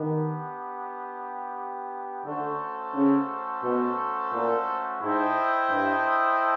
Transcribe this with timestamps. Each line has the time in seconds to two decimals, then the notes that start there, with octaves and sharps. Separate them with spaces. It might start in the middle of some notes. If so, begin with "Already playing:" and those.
Already playing: D#3 B3 D4 G4
2.25 D3 A3 C#4 F#4 A4 C5
2.94 C#3
3.63 B2
4.32 A#2
5.00 G#2 E4 A4 C5 D#5 G5
5.70 G2